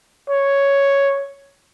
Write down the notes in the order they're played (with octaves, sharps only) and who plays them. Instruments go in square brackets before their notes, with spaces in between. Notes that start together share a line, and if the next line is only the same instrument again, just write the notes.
[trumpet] C#5